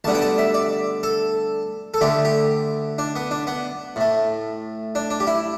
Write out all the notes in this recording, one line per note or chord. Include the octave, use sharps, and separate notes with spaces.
D2 D3 G3 B3 A5
G5
A5
E5
D5
A4
A4
D2 D3 A3 G4
G4
D4
B3
D4
B3
A2 A3
D4
D4
G4
E4